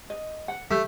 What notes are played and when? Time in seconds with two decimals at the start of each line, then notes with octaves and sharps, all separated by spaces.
0.10 D#5
0.48 F#5
0.71 A3 G4